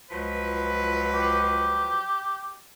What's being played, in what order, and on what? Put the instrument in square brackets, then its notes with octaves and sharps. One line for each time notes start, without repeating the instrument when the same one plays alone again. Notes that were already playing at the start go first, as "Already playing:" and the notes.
[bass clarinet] C#2 [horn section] F3 F#3 B4
[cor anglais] G4